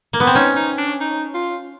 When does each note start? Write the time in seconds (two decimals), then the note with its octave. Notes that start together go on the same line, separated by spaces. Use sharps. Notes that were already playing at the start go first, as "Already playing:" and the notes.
0.13 A#3
0.20 B3
0.27 C4
0.35 C#4 D#4
0.56 D#4
0.78 D4
1.00 D#4
1.34 F4